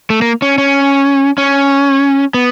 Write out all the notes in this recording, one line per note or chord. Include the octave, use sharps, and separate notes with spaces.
A3
A#3
C#4
C#4
C#4
B3